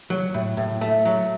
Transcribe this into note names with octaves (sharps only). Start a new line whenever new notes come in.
F#3
A2
A2
A3
F#3